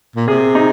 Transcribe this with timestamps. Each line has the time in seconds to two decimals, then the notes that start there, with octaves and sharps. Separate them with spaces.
0.16 A#2
0.27 C3 G#4
0.55 D#4